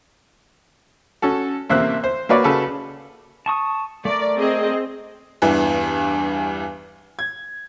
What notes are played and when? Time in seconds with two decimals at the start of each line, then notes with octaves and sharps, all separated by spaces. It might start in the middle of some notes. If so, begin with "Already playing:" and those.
1.22 C#4 F#4 A4
1.70 A1 C3 A#3 C5 E5 F#6
2.04 C5
2.29 A#3 F#4 B4 C#5 D5
2.44 C#3 F#4 A4 B4
3.46 A5 C#6 D#6
4.05 A3 A#4 D5
4.38 C4 G#4 D#5
5.42 E2 G2 E3
7.19 G#6